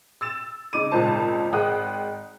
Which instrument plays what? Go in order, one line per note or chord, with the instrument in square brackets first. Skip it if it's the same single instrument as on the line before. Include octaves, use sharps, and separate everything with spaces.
[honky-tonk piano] E6 A6 E7
C#3 D#4 D6 D#7
G#1 C#2 A#2 D#4 C5 A5
G#1 G#3 F#5 G5 D#6 F#6